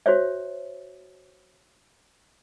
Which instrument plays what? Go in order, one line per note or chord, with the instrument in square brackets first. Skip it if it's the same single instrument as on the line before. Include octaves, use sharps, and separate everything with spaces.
[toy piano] F#4 C5 C#5 E5